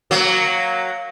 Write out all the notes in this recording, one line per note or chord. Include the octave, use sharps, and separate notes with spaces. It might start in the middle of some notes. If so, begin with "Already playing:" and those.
F#3 A#3